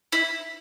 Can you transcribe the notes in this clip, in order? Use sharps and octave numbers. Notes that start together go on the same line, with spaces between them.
E4